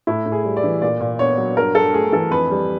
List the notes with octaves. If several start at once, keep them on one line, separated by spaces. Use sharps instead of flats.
A2 E4
A2
G#4
G3
D5
E3
A#2 D5
A#2
B3 C#5
F#3
G2 A#4
G2 A4
A3 G#4
E3 A4
F2 B4
G3